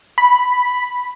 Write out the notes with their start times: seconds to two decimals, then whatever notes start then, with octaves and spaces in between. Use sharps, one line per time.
0.18 B5